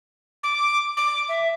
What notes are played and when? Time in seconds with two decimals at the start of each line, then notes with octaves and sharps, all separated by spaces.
0.43 D6
0.97 D6
1.29 E5